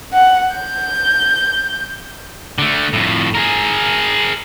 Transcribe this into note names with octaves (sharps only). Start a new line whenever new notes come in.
F#5
G6
D3 A3
F2 A2
G#4 A#4